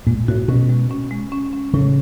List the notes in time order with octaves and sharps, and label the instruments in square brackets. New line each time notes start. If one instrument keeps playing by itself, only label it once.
[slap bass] A#2 [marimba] G#3
[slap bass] A2 [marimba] F#4
[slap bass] B2 [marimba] C#4
[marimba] G#3
C#4
G#3
C#4
C#4
[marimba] A2 [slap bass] C#3